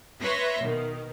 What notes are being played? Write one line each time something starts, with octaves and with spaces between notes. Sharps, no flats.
B4 C#5 E5 C6 A#6
B2 D#3